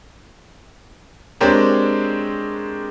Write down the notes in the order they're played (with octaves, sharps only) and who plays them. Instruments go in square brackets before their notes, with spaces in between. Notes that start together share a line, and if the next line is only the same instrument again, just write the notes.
[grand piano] G#3 C4 D4 G4 A#4 C#5